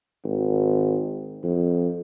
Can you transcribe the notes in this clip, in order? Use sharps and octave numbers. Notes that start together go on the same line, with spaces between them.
G#1
F2